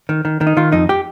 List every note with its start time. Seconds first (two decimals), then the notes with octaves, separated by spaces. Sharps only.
0.09 D#3
0.25 D#3
0.41 D#3
0.47 D#4
0.57 D#3 F4
0.72 F2 D#4
0.89 G4